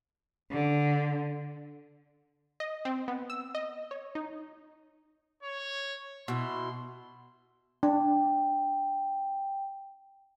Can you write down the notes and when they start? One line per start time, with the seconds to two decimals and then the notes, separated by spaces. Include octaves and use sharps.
0.51 D3
2.60 D#5
2.85 C4
3.08 B3
3.30 E6
3.55 D#5
3.91 C#5
4.15 D#4
5.43 C#5
6.28 B2 E4 C6
7.83 D4 G5